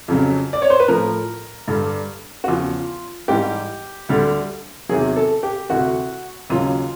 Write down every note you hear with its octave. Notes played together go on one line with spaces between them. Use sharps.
F2 C#3 F#3
D5
C#5
C5
B4
A2 F3 A#4
G2 D3 G3
F#4
E2 C#3 F3 F4
G#2 E3 G3 G4
D2 D3 G3
E2 C3 D#3 F#3 G#4
A4
G4
D2 C3 E3 F#4
D#2 C#3 F#3 F4